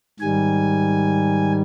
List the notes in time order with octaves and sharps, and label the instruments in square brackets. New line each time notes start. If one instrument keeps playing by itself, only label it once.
[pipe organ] G#2 D#3 G3 G#5